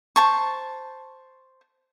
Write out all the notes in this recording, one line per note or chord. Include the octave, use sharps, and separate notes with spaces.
C5 A5 C#6